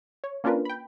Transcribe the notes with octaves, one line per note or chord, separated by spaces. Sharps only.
C#5
A#3 C#4 D4 F4 A#4 B4
G5 B5